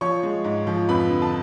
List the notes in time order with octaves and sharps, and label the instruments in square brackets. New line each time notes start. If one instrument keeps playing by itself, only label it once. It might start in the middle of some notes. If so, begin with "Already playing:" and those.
[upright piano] F3 C#5 C#6
G#3
G#2
F3
F2 B4 B5
D3
A5